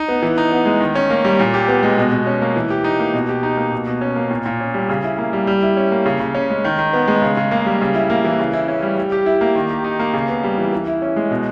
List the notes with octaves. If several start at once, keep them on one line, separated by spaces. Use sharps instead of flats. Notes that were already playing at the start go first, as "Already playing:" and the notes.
Already playing: D#4
B3
E3
D#4
B3
G#3
D#3
C#4
A#3
G3
A#2
G4
B3
G#3
B2
B2
C#4
A#3
E3
G4
D#4
A#3
B2
G4
D#4
A#3
B2
B2
C#4
A#3
A#2
A#2
C#4
G3
C#3
E4
A#3
G3
G3
E4
C#4
A#3
C#3
C#3
C#4
G#3
D#3
D#3
B3
G#3
C#3
C#3
A#3
G3
C#3
E4
A#3
E3
C#3
E4
C#4
G3
G3
G4
E4
A#3
D#3
G4
D#4
A#3
C#3
B3
G3
E3
E3
E4
C#4
G#3
B2